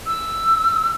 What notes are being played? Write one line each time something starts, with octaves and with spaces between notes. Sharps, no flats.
E6